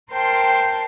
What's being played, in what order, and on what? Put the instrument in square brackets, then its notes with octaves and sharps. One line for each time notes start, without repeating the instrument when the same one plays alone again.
[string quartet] A#4 C5 G5 A5 C6